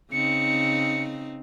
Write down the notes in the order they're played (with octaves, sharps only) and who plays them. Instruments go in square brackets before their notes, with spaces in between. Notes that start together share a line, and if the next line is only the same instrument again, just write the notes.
[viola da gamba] C#3 C4 D#4 [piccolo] C#7